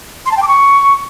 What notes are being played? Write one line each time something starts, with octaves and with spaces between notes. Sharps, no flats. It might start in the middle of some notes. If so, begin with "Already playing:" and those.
C6
A5
G5
D6
C#6